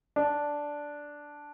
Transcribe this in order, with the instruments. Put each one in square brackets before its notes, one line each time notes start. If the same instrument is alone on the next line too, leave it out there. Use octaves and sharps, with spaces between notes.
[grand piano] D4